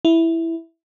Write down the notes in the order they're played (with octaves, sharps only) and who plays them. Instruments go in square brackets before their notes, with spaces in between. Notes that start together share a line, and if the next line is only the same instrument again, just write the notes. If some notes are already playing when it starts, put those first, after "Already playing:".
[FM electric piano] E4